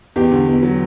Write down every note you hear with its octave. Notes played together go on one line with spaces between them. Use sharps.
E2 G4
D3
E2
F#3